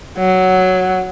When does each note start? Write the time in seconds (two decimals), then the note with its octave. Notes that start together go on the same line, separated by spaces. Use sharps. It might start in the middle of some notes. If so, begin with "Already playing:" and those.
0.18 F#3